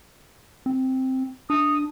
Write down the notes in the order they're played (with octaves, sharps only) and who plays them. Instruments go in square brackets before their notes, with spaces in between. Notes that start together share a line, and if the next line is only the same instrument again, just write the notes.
[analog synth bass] C4
[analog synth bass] D4 [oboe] D#6